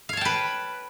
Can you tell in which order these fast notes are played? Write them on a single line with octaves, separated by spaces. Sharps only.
F5 C#5 A5 G5 B4